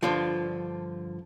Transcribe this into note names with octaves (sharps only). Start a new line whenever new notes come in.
G2 D3 F3 F4